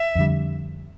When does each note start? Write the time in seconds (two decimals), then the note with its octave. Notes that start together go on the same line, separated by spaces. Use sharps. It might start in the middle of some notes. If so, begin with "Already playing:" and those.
Already playing: E5
0.15 F2 D3 G3